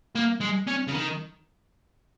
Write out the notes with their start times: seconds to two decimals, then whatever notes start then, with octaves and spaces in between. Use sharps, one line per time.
0.15 A#3
0.40 G#3
0.67 C#4
0.87 C#3
0.92 D#3